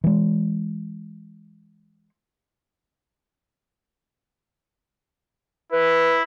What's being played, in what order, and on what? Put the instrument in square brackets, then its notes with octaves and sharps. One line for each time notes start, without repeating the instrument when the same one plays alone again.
[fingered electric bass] E3 G#3
[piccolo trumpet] E4 [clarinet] B4